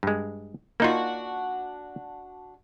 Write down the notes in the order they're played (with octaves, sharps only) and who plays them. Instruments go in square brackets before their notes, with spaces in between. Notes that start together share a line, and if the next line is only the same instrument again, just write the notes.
[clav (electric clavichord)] G2 G#3
[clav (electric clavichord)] A#3 D#4 F4 [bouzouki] D4 F#4